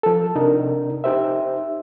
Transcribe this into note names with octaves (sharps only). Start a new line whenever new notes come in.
F3 A4
C3 D4 D#4 A#4
D#4 G4 C5 E5